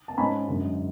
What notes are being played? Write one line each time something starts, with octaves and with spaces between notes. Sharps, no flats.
A5
G#2 G#3 C#4 G#5 B5
F#2 D3 G#3